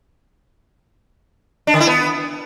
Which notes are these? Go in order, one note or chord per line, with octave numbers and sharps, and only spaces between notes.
D4
D3
E4
B3